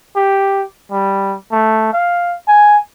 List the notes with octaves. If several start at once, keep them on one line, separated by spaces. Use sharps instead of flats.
G4
G3
A3
F5
G#5